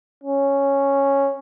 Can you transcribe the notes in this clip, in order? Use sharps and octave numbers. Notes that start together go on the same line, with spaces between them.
C#4